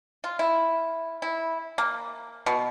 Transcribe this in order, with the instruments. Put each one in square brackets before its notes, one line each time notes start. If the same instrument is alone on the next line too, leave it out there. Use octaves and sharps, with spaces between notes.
[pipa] F4
E4
E4
A#3
B2